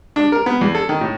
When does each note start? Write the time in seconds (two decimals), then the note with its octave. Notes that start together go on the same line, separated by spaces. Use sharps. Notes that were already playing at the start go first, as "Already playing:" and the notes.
0.16 D4
0.32 A#4
0.46 B3
0.61 E2
0.75 A4
0.89 D#3
1.01 A2